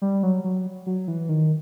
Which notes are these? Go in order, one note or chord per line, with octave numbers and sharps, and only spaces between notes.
G3
F#3
F#3
F#3
E3
D#3